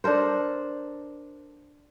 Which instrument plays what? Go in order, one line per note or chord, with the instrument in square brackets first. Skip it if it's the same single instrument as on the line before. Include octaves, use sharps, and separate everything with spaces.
[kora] D4 A4 A#4 C5